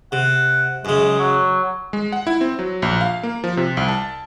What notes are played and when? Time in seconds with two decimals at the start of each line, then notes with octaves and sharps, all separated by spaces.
0.12 C3 F#5
0.85 F#2 C#3 G#3
1.19 F#3
1.93 G#3
2.12 F#5
2.27 E4
2.41 C4
2.59 F#3
2.82 A#1
3.01 F5
3.23 A#3
3.44 F3
3.57 C3
3.77 C2
3.88 A5